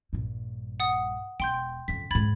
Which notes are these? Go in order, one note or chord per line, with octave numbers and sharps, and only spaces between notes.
A#1 G2
F#5 D#6
E1 G5 C6 G6
F2 C#3 B6
E2 G#2 B5 G#6 A6